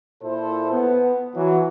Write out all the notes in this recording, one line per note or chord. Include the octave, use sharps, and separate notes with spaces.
A#2 E4 A4 C5
B3
E3 F#3